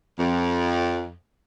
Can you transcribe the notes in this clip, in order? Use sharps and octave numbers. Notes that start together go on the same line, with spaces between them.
F2